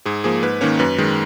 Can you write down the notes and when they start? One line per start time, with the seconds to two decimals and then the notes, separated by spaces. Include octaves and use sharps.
0.05 G#2 G#4
0.24 F3 A#3 G#4
0.43 G#2 B4
0.61 D#3 A#3 C#4 C#5
0.79 F#2 B4
0.98 D#3 G#3